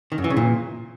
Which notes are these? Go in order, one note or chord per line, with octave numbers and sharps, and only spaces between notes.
D#3
F#2
E3
C#3
A#2